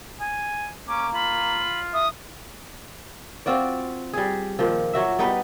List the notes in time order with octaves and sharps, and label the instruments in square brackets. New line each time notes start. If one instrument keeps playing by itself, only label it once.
[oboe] G#5
[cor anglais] A#3 [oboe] C#4 [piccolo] D6
[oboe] F4 [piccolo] B5
[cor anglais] E5 [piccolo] D#6
[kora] C4 F4 F#4 D5
G3 G#4
A#2 D#3 F3
F#3 F#4 E5
G3 B3 D#4 B4